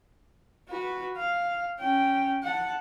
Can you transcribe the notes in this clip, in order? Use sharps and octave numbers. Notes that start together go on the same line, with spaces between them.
F#4 B4
F5
C#4 G5
F#5 A5